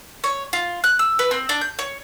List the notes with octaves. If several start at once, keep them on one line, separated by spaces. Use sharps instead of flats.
C#5
F4
F#6
E6
B4
C4
D4
G6
C#5